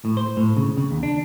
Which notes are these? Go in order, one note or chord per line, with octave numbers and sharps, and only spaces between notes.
A2
C5
A2
C#3
C#3
D#2
D4